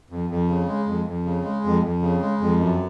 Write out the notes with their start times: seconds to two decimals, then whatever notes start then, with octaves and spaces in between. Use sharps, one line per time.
0.10 F2
0.30 F2
0.49 C#3
0.67 G#3
0.86 F2
1.06 F2
1.25 C#3
1.45 G#3
1.64 F2
1.83 F2
2.02 C#3
2.21 G#3
2.41 F2
2.59 F#2